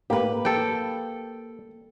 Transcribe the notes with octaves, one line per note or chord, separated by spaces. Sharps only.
A#3 G4 B4
A4 G5